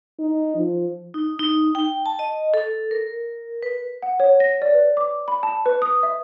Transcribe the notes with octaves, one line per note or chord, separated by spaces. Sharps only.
D#4
F3
D#4
D#4
G5
A5
D#5
A4
A#4
B4
F#5
C#5
A#6
D5
B4
D6
B5
A5
B4
D#6
E5